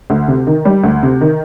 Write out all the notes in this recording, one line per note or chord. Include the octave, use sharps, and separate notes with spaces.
D2
C3
D#3
G3
D2
C3
D#3